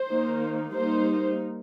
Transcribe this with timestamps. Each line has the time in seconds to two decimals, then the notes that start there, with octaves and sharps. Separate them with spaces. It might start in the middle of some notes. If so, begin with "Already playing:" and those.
Already playing: C5
0.10 D#3 A#3 D#4
0.74 G3 A#3 D#4 C5